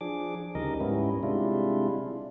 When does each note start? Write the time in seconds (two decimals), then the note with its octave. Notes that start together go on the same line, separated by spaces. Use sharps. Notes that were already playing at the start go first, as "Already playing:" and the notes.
0.01 F3 D4 G#4 D6
0.55 D2 C#3 G3 D#4 A#4 D#5
0.81 G#2 G3 B3 C#4 E4
1.23 C3 G3 G#3 D4 E4 F4